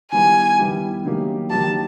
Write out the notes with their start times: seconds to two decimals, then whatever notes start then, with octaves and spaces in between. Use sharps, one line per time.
0.12 D#3 G3 B3 E4 G4 G#5
0.58 D#3 G3 B3 E4 G4
1.05 D#3 F#3 A#3 D#4 G4
1.50 D#3 F#3 A#3 D#4 G4 A5